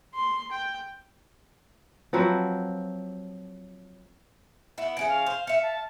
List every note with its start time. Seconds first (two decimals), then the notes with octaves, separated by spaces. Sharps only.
0.15 C6
0.52 G5
2.13 F3 F#3 C4 B4
4.78 B3 E4 F#4
4.97 E3 C#4 G#4 D7
5.09 F5
5.26 C5
5.47 E5 F5 C#7
5.63 A5